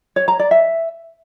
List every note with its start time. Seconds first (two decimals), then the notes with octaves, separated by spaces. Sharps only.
0.16 C#5
0.28 A#5
0.39 D5
0.51 E5